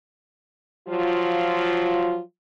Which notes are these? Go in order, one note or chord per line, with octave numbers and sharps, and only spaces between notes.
F3 F#3 F4